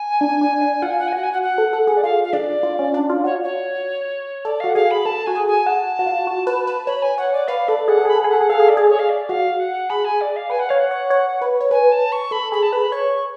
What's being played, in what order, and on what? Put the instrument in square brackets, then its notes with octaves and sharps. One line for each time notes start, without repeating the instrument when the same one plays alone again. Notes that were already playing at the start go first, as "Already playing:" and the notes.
Already playing: [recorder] G#5
[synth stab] D4
D4
D4
[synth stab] F4 [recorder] F#5
[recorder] G#5
F#5
G#5
[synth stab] F#4 [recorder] F#5
[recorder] G#5
F#5
F#5
[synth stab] A4
A4
G#4
[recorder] D5
[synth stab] F4 [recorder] F5
[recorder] F5
[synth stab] D4 [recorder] D5
[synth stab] F4
C#4
D4
F4
[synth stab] F#4 [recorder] C#5
[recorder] C#5
[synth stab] A4 [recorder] D5
[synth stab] F#4 [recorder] F5
[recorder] F#5
[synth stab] G#4 [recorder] F5
[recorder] B5
[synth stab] A4 [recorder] A5
[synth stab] F#4 [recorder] G#5
[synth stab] G#4
[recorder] G#5
[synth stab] F#4 [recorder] A5
[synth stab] F#4
F4
F#4
B4
B4
[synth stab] C#5 [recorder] B5
[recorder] G#5
[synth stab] C#5 [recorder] F#5
[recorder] D5
[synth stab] B4 [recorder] F5
[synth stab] A4 [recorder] D5
[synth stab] G#4 [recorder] F#5
[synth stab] A4
[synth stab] G#4 [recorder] B5
[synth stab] A4
G#4
[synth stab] A4 [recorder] F#5
[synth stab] G#4
[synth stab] A4 [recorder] F5
[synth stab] G#4
[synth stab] A4 [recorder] D5
[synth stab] G#4
[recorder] C#5
F5
D5
[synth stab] F#4 [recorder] F5
[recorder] F#5
[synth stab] G#4 [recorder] B5
[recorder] G#5
D5
F5
[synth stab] B4 [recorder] G#5
[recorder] F#5
[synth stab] C#5 [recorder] F5
[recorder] F#5
[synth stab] C#5
C#5
B4
C#5
[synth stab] B4 [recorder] G#5
[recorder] A5
C#6
[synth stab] A4 [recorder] B5
[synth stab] G#4 [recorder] B5
[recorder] A5
[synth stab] B4 [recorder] B5
[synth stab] C#5 [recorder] C#6